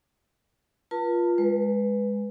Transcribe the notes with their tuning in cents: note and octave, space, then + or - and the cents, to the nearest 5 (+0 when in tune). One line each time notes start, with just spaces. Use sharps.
F4 +0 B4 -45 A5 +35
G#3 -5 B4 +0